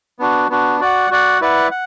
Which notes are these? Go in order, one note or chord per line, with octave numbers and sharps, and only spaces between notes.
B3 D4 F#4
B3 D4 F#4
F#4 D5 F#5
F#4 D5 F#5
E4 B4 D5 F#5
F#5